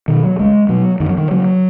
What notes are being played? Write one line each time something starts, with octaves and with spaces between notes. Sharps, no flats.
B2 D#3
F#3
C#2 G#3
B2 F#3
F#2 D#3
F#3
D#3
C#3 F#3